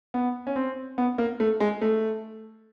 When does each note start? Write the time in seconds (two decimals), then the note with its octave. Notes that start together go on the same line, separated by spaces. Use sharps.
0.14 B3
0.47 C#4
0.56 C4
0.98 B3
1.18 A#3
1.40 A3
1.60 G#3
1.81 A3